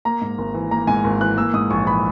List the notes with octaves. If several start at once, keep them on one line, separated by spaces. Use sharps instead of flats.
A#3 A#5
G#2
G#1
E3
A#3 A#5
G#2 G#5
G#1
E3 F#6
A#3 E6
G#2 D#6
A#1 C#6
E3 B5